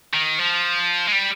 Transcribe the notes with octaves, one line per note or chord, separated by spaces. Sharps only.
D#3
F3
G#3
G3